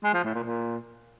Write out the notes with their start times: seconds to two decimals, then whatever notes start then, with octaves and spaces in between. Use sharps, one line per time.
0.04 G#3
0.14 F3
0.24 A2
0.34 A#2
0.44 A#2